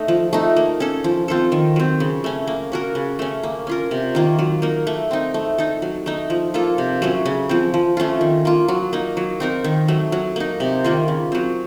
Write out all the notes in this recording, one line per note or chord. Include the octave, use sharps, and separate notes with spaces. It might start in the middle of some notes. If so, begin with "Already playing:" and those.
Already playing: A3 D#4
F3
A3 D#4
A#3
C#4 A4
F3
C4 F4 A4
D#3
F#3 C4
C#3
A3 C#4
A#3
C#4 F#4 A#4
C#3
A3 C#4
A#3
C#4 F4 A#4
C3
D#3 A#3 F4
F#3
A#3 D#4 A#4
A3
C4 D#4
A3
D#4 A4
F#3
A3 D#4
F3
A#3 F4 A4
C3
F#3 A3 C#4
C#3
F3 C4
F3
A3 C#4 F4
D#3
A#3 F4
F#3
A#3 D#4
F#3
C4 D#4 A#4
D#3
F#3 A3
F#3
A#3 D#4
C3
D#3 A#3 F4
C#3
F#3 C4